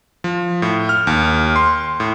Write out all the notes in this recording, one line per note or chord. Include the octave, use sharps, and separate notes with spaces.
F3
A2
F6
D#2
C6
A2